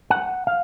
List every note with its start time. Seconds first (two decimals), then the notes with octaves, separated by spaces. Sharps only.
0.10 F#5
0.47 F5